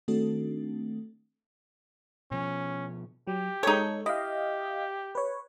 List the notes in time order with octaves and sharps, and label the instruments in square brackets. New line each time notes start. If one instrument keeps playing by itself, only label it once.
[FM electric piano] D#3 A3 C4 D4 F#4 A4
[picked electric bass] B2 F3 [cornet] C#4
[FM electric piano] F#3 [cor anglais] G4
[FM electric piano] G#3 A4 [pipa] D#4 C#5
[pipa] E4 [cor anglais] G4 [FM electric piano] D#5 F5
[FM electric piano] B4 C#5